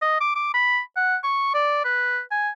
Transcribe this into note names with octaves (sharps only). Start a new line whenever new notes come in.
D#5
D6
D6
B5
F#5
C#6
D5
B4
G#5